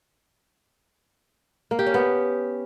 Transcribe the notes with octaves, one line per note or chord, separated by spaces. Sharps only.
A#3
G4
C#4
B3